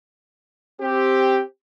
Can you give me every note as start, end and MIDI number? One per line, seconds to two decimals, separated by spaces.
0.81 1.41 60
0.81 1.41 67